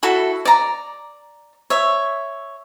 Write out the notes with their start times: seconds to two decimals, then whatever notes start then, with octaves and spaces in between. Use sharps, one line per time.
0.03 E4 F#4 A4
0.45 D5 A#5
1.70 C#5 E5